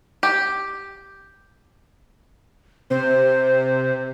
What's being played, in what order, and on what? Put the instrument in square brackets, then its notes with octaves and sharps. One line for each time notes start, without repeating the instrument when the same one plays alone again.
[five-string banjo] G4
[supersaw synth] C3 [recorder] C5